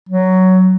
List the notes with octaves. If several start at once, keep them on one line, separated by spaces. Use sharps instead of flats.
F#3